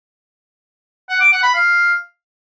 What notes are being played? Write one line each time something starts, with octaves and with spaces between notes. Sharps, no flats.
F#5
D6
F#5
B5
F5